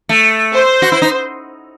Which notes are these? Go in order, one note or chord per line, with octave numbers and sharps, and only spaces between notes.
A3
C5
F#4
E4
D#4